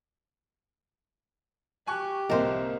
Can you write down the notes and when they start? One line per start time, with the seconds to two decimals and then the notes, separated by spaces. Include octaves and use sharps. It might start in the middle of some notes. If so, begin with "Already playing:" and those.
1.87 G4 G#5 C#6 F#6
2.30 C2 A#3 A#4 C5 D#5 A5 C6